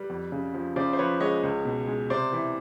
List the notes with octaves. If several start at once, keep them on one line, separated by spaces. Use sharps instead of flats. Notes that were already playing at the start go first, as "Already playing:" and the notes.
Already playing: G3 B4
F2
C#3
F3
C#3 C5 D5
C5
F3 B4 C#5
G#3 C#5 D#5
C#2
B2
G#3
C3 C5 D5
E3